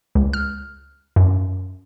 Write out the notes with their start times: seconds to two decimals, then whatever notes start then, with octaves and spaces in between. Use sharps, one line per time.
0.15 C#2
0.33 F6
1.16 F#2